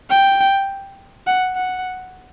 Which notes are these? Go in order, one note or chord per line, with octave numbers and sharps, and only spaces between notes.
G5
F#5
F#5